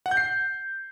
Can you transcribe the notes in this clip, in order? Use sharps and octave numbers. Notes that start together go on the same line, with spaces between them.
F#5
G6
C7